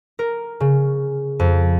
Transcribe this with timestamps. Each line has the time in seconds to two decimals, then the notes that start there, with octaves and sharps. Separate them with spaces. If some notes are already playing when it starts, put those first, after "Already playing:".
0.19 A#4
0.60 C#3
1.39 F2